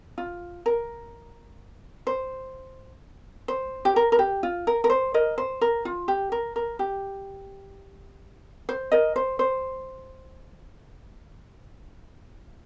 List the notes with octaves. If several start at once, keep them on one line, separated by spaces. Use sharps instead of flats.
F4
A#4
C5
C5
G4
A#4
A#4
G4
F4
A#4
A#4
C5
A#4 D#5
C5
A#4
F4
G4
A#4
A#4
G4
C5
A#4 D#5
C5
C5